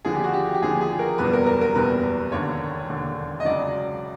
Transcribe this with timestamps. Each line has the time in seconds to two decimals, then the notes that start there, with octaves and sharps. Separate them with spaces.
0.05 D#2 D3 F3 G#4
0.15 G4
0.24 F#4
0.33 G4
0.54 G4
0.62 D#2 D3 F3 G#4
0.81 G#4
0.99 A#4
1.18 F#1 E2 B2 G3 B4
1.33 A#4
1.47 A#4
1.61 A#4
1.75 F#1 E2 B2 G3 B4
2.32 E1 D#2 D3 C#5
2.89 E1 D#2 D3
3.40 D#5
3.45 C#2 C#3 F#3 D5